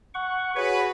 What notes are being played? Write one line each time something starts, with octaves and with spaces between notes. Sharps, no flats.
F#5 C#6
F#4 G#4 B4 C#5